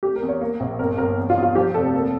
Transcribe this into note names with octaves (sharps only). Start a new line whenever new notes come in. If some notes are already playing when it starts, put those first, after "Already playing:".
A3 G4
A#4
E2
C#5
A#3
A#1
G1 A#4
G1 A#4
E2
F4
E2
F4
F3 G4
F1 A4
A#3